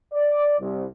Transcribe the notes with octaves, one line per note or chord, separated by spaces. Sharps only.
D5
C2